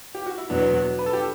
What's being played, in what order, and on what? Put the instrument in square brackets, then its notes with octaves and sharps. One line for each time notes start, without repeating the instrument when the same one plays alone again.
[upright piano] G4
F#4
E4
[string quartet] E2 B2 F#3 B3 [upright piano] D4
[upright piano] B4
A4
G4